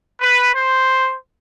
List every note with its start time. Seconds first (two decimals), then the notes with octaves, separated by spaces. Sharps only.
0.21 B4
0.54 C5